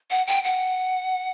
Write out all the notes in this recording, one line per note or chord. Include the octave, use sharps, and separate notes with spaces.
F#5
G5
F#5